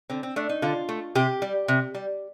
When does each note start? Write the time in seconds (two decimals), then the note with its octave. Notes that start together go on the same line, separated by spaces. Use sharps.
0.10 D3 C4
0.23 C4
0.36 A3 D4
0.49 D#4
0.62 D3 F4
0.89 A3
1.15 C3 G4
1.42 G3
1.68 C3
1.95 G3